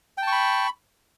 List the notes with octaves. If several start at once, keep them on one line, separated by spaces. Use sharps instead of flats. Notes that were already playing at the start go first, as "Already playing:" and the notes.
G5 A5 B5 C#6